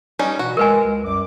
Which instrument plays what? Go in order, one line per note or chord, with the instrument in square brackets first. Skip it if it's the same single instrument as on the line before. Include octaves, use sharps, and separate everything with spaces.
[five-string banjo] G3 C#4 D#4
[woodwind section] B2 E3 [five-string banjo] F#4
[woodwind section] G#3 [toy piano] A#4 B4 G#5
[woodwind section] C#2
C2 F#2 D6